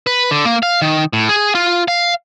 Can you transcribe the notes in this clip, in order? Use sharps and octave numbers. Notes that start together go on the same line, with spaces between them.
B4
D3
A#3
F5
D#3
A2
G#4
F4
F5